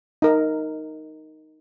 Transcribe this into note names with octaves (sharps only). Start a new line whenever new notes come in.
D#4 A#4